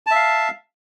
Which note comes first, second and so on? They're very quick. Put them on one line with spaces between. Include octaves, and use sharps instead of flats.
A5 E5 F5